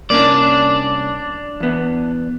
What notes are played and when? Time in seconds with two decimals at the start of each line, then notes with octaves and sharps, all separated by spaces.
0.10 C2 A#3 C#4 D4 D5
1.60 E2 B3